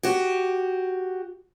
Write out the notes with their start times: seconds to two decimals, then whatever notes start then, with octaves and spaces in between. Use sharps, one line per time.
0.03 F#4 G4